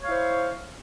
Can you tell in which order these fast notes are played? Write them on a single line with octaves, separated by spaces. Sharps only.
C#5 F5 E4 C5